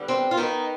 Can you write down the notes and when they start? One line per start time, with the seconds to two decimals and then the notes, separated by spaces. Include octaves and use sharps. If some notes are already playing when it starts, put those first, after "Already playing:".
Already playing: D3 G3 B3
0.08 C4
0.31 F4
0.37 D#3 B3 D#4